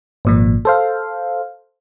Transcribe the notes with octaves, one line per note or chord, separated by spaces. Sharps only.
G#1 A#2 F3
A4 C5 F5